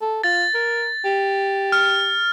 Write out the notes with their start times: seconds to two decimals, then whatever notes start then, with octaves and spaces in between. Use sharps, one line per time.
0.01 A4
0.24 F4 A6
0.54 A#4
1.05 G4
1.72 F6